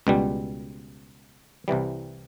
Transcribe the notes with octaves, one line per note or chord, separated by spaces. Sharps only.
C#2 B2 G3
C2 C3 E3 G3